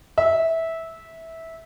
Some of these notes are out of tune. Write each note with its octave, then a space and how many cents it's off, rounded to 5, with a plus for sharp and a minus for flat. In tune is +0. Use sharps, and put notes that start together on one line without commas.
E5 -15